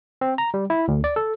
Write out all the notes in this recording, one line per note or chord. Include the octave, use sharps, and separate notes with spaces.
C4
A#5
G3
E4
D2
D5
A4